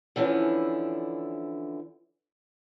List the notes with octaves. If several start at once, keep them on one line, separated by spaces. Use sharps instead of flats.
D3 E3 F3 C#4 D4 E4